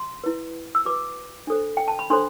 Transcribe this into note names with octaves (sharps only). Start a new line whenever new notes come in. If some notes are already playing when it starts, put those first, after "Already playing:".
Already playing: C6
E4 B4
E6
F#4 B4 D6
D4 A4 C5
G5
A5
B5
D4 A4 C5 C6